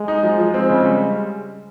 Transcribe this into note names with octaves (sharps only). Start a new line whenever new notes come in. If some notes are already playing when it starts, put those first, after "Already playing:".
Already playing: G#3
D#4
F3
F3
G#3 C4
C#3
G3